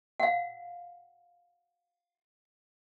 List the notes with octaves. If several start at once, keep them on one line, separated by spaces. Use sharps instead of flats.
F5 F#5